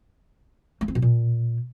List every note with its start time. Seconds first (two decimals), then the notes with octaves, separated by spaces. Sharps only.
0.81 A3
0.88 C4
0.95 B2
1.02 A#2